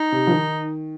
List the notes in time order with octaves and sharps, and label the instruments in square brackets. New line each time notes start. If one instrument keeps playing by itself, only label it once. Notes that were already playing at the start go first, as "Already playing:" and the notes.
Already playing: [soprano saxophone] D#4
[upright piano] C3
F3
D#3